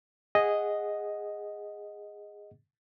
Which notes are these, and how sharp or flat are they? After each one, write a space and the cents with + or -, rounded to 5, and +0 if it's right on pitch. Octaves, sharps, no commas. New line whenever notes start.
G#4 -15 D#5 +0 F#5 -10